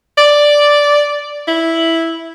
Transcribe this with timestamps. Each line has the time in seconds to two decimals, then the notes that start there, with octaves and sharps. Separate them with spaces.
0.18 D5
1.48 E4